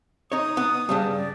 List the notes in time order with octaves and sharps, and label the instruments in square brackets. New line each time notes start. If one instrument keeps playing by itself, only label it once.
[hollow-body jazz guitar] D#4 C#5 [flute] D#6
[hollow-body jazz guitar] B3
G2 C#3 G3
[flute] D5